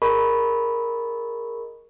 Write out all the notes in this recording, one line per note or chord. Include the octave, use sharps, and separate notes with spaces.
G#4 A#4 D#5 B5 C#6